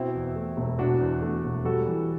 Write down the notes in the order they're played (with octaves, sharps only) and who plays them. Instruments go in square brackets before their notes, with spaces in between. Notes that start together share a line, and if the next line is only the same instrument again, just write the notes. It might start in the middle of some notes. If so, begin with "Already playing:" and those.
Already playing: [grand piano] B2 [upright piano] C4 E4
[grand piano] E2
A3
E1
[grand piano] B2 [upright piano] D4 F#4
[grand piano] E2
A3
E1
[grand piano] G3 [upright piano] F#4 A4
[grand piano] E3